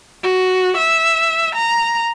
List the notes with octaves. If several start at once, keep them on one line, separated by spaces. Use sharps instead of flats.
F#4
E5
A#5